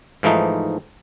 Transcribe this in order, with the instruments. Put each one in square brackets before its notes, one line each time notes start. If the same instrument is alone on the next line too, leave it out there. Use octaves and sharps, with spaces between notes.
[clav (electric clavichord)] G#2 E3 F3 A3 D#4